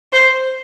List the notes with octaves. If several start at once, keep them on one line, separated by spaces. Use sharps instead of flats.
C5